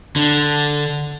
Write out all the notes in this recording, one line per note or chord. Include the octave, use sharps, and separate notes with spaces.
D3